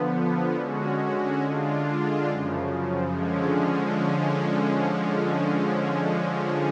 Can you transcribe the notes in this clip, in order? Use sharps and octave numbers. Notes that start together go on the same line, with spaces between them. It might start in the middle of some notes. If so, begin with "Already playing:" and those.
Already playing: D3 F3 B3
D3 G#3 C#4 F#4
D3 G#3 D4 F4
F#2 C#3 F3
D3 F3 G#3 C#4